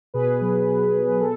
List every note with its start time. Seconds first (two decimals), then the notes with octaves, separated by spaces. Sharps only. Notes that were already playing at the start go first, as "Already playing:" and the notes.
0.14 B2 G#4 B4
0.41 F#3
0.67 B2
0.94 F#3
1.21 B2 A4